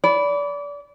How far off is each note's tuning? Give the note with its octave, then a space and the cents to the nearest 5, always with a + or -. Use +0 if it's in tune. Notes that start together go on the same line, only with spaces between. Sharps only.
D5 -30 B5 +0